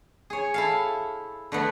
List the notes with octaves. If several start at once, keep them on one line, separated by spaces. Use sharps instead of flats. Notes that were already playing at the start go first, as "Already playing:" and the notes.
G#4 C#5
E4 A4 F5
D3 A3 B3